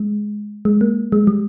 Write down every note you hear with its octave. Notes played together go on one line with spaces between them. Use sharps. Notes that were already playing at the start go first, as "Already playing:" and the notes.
Already playing: G#3
G#3
A#3
G#3
G3